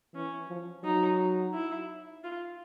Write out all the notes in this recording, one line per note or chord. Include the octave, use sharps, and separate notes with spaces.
E3 C#4
F3
F#3 D#4
E4
F4